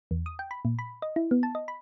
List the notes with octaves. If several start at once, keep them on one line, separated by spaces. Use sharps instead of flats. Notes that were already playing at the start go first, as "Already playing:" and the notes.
E2
D#6
G5
B5
A#2
B5
D#5
E4
B3
A5
D#5
B5